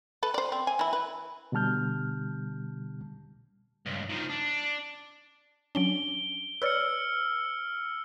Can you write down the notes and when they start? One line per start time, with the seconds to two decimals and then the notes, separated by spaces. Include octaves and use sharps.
0.23 A4 B4
0.34 C5 D5
0.52 C4
0.67 G#5
0.79 E3 E4
0.93 B4
1.52 B2 D3 G3 A5 F6 G6
3.86 C#2 G2
4.09 D#3 F3
4.29 D4
5.75 F#3 C#4 D4 D7 G7
6.62 B4 C#5 D5 E6 F6 C#7